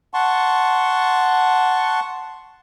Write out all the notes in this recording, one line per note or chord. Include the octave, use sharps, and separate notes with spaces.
F#5 A5 C6 C#6